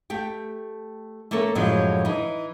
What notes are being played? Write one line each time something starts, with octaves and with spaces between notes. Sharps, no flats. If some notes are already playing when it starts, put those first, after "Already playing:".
A3 G4 G5
A3 A#3 C#4 A4 A#4
F#2 A2 D3 F3 F#3 G#3
E3 D#4